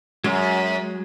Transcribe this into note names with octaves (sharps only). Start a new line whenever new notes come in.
F#2 F#3 G#3